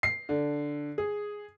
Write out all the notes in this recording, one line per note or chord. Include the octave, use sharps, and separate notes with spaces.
C7
D3
G#4